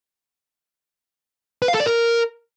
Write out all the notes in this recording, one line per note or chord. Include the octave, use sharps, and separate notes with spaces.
B4
F5
A4
D5
A#4